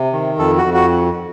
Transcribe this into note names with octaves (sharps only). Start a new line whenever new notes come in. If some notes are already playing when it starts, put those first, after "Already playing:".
Already playing: C3
D#3
F2 A4
F#4
F2
F#4